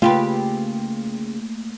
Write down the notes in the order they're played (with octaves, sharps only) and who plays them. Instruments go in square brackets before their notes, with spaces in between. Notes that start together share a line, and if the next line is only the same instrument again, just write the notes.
[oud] C#3 G4 B4 [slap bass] A3 A#3 [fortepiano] F4